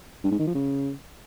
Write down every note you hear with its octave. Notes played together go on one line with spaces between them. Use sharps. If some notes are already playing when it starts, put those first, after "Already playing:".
G2
G#2
D#3
F3
C#3